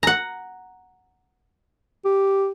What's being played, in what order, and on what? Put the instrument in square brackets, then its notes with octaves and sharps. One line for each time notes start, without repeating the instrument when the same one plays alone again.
[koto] F#5 A#5
[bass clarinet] G4